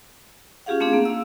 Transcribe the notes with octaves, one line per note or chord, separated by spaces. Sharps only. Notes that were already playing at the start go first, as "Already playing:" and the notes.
C#4 F4 G4 G#4 F5 F#5
A3 C4 D4 G#4 F5
A#3
F5 E6